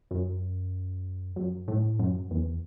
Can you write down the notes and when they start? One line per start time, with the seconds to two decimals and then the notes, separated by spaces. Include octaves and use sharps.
0.11 F#2
1.36 F#2
1.68 A2
1.99 F#2
2.31 E2